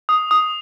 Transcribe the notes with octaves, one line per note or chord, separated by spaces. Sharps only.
D#6
D#6